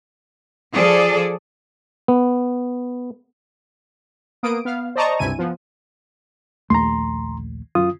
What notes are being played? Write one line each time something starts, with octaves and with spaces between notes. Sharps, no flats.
F3 G#4 A4 D5
B3
A#3 B3 D#6 D7
B3 F5
C5 D5 D#5 A5 A#5 C#6
C#2 G2 C3 E4 G#5 D#7
F3 B3
A#1 D#2 A3 A#5 C6
F#2 F4 D#6